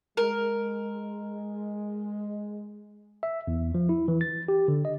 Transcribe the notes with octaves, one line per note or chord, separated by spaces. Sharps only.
G#3 A#4
E5
E2
F3
E4
E3
A6
G4
D3
D#5